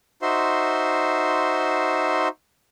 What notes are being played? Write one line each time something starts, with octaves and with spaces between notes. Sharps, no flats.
D#4 F#4 C5 E5 C6